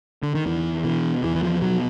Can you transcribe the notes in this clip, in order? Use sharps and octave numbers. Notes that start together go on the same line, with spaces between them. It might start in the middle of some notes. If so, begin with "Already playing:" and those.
D3
D#3
E2 E3
B2 E3
E2 E3
E3
F3
B2 F#3